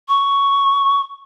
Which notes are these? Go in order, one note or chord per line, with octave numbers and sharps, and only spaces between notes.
C#6